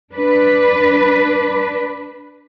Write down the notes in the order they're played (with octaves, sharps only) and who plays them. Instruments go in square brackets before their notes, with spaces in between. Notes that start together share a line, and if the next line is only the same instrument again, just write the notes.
[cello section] D4 B4